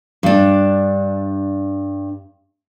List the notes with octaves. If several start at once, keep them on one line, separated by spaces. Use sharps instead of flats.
G2 D4